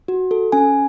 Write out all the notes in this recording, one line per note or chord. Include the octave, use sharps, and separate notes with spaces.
F#4
A4
C#4 G#5